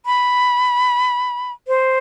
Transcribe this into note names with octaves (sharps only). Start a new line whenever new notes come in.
B5
C5